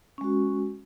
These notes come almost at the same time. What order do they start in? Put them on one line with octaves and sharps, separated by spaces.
C#4 G#3 F#4